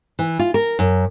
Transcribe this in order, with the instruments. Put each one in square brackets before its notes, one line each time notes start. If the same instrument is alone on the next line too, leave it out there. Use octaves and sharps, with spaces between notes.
[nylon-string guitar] E3
F4
A#4
F#2